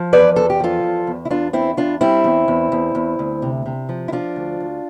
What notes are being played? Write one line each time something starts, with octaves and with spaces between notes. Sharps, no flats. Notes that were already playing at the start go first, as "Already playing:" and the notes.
Already playing: F3
E2 B4 D5
E2 A4
G4
F3 F4 A4
E2
E2
E4
E2 D4 F4
E2 C4 E4
E2 D4 F4
G3 C4 E4
E2
E2
E2
E2
D2
C3
C3
F3
E4
F3 D4 F4
D2
D2